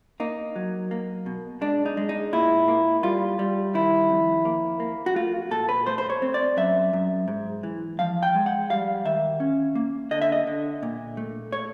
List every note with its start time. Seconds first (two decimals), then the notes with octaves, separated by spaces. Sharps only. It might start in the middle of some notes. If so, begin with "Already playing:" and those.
0.20 A#3 D#4
0.56 F#3
0.91 A#3
1.26 B2
1.61 G#3 D4
1.86 D#4
1.97 G#3
2.09 D#4
2.33 A#2 E4
2.68 A#3
3.03 G3 F4
3.39 G3
3.74 D#3 E4
4.10 F2
4.45 A#3
4.80 A#3
5.06 F#4
5.16 A3 F4
5.51 A#2 A4
5.69 B4
5.86 A3 C5
5.98 C5
6.10 C#5
6.22 C4
6.34 D5
6.57 F#2 E5
6.93 F#2
7.28 G#2
7.63 E3
7.99 F3 F5
8.23 G5
8.35 G#3
8.46 F#5
8.70 G3 F5
9.05 D#3 E5
9.40 C#4
9.75 A#3
10.11 D3 D#5
10.22 E5
10.32 D#5
10.47 D3
10.83 A#2
11.17 A3
11.52 C#5